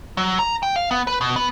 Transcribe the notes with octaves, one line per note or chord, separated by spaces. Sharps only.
F#3
A#5
G5
F5
B3
B4
B2
B3